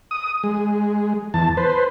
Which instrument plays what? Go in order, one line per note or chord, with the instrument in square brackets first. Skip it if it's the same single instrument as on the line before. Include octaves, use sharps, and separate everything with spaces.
[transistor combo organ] D#6
G#3
E2 A5
B4 C5